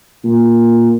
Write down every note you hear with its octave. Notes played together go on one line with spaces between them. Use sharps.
A#2